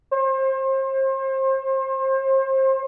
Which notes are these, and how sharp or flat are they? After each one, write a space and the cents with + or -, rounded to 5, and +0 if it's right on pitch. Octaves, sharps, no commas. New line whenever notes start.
C5 +35